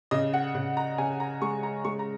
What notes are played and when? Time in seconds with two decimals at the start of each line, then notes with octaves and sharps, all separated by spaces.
0.11 C#3 D#5
0.33 F#5
0.55 C#3
0.77 A#5
0.98 C#3 G#5
1.20 A#5
1.42 G#3 C#6
1.63 A#5
1.85 G#3 C#6
1.99 A#5